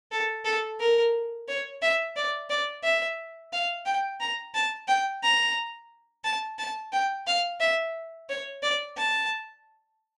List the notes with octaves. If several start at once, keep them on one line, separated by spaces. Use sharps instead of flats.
A4
A4
A#4
C#5
E5
D5
D5
E5
F5
G5
A#5
A5
G5
A#5
A5
A5
G5
F5
E5
C#5
D5
A5